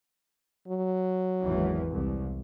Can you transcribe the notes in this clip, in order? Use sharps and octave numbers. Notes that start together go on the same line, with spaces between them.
F#3
G#1 E2 E3
C2